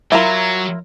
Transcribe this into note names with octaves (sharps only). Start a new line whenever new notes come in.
F#3 E4 F4 A#4